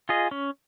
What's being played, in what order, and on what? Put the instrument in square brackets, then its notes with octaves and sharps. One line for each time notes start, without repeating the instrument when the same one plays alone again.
[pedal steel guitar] F4 G#4 D#5
C#4